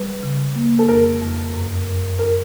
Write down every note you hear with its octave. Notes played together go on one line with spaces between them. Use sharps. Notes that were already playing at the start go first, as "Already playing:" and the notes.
Already playing: G3 B4
C#3
A#3
A4
F2 A#4
F2
F#2
F#2
A#4